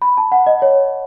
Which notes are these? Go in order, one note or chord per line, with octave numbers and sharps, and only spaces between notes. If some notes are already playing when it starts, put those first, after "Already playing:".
B5
A5
F#5
D#5
C#5